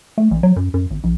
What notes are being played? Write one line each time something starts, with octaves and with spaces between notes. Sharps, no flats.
A3
A1
F#3
F#2
F#2
G#1
A#1